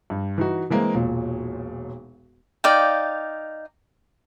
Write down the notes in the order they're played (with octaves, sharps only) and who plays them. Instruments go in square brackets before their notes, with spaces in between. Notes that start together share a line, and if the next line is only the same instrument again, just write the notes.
[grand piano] G2
E3 D#4 F#4
E3 G#3 A#3 C4
E1 B1 A#2
[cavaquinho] D#4 D5 F5 G5